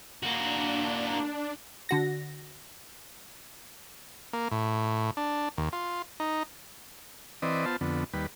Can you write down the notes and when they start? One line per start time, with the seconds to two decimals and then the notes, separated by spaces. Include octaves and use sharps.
0.23 A#3 D4 F#4
1.89 D3 F#4 A#6
4.33 A#3
4.51 A2
5.17 D4
5.57 D#2
5.72 F4
6.20 D#4
7.42 E3 C4 B4 D5 D#5
7.66 B3 F4 C5 A5
7.81 F2 D3 B3
8.13 D#2 G3 B4